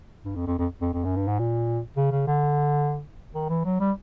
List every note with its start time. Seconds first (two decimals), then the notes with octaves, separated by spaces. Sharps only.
0.24 G2
0.36 F2
0.47 F2
0.59 F2
0.82 F2
0.93 F2
1.05 F#2
1.16 G2
1.28 G#2
1.39 A#2
1.97 C#3
2.12 C#3
2.27 D3
3.35 D#3
3.50 E3
3.65 F#3
3.81 G3